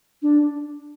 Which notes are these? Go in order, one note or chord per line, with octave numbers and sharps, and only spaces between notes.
D4